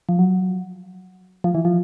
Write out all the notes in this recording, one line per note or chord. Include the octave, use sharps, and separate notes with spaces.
F3
F#3
F3
E3
F3